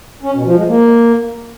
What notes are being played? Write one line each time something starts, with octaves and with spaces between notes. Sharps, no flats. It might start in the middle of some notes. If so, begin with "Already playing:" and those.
C#4
B2
F3
G#3
A#3